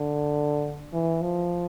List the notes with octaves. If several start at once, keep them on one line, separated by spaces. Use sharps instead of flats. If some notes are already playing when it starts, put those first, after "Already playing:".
Already playing: D3
E3
F3